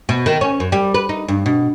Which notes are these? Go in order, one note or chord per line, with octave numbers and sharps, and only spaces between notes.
B2
D#3
C#4
F#2
G3
B4
D#4
G2
B2